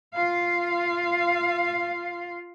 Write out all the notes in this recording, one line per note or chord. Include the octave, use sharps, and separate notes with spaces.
F4 F5